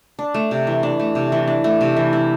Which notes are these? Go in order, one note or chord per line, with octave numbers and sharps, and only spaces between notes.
D4
A3
C3
E3
D4
A3
C3
E3
D4
A3
C3
E3
E4